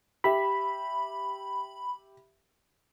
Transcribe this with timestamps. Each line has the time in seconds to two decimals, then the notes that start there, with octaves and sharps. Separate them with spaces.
0.24 G4 E5 B5